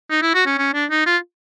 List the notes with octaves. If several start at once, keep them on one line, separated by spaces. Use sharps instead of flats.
D#4
E4
F#4
C#4
C#4
D4
D#4
F4